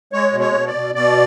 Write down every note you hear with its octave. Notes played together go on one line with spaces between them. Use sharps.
G#3 C#5
B2
C#5
B2
D5
B2
B2 D5